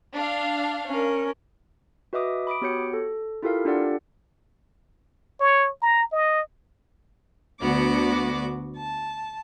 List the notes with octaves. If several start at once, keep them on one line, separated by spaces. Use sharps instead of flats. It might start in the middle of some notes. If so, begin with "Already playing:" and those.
D4 F5
C#4 A#4
F#4 B4 D#5 E5 D6 D#6
B5 D6 D#6 D7
B3 F#4 G4 C#5 G6 C#7
A4
E4 F4 G4 A4 A#4 F5
D4 F4 G4 A4 D5 F#5
C#5
A#5
D#5
D2 D3 B3 F#4 D6
A5